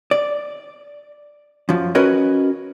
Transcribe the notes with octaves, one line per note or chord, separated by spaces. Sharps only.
D5
F#2 F3
C#4 F#4 A#4 B4 C#5 D#5